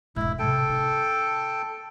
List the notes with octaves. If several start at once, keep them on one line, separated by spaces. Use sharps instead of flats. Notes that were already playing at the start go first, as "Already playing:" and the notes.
E1 G#2 E4
A2 C3 A4 G5
D#4